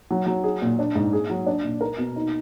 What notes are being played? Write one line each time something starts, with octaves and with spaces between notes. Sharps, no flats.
F#3
F#3
G#4
A#2
D4
G#2
G#4
F#3
D4
A#2
A#4
B2
D#4